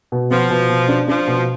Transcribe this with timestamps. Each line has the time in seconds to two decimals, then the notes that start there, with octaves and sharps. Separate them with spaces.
0.12 B2
0.30 F3 B3
0.50 B2
0.69 B2
0.89 D4
1.08 F3 D4
1.27 B2